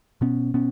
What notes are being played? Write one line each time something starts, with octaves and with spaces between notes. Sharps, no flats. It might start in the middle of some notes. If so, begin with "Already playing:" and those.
B2 B3 C#4
B2 B3 C#4